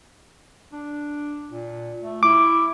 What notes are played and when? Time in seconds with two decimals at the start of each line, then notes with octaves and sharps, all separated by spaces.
0.73 D4
1.51 A#2
2.02 A3
2.23 E4 D6